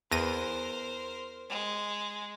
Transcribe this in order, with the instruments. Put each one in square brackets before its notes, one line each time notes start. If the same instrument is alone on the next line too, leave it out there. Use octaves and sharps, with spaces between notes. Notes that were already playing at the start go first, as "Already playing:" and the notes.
[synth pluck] E2 A#6 D#7 [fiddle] A#4 C5
[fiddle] G#3